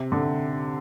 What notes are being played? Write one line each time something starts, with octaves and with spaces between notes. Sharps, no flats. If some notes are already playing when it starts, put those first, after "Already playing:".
Already playing: C3
D3